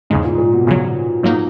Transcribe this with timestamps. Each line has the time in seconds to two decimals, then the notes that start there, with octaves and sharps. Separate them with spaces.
0.10 E2 G#2 C#3 G#3
0.24 A#2
0.38 A#2
0.53 B2
0.67 E2 C#3 F#3
1.23 G#2 F#3 A#3 D#4